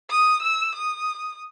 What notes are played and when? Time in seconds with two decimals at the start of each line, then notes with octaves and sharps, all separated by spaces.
0.10 D#6
0.42 E6
0.75 D#6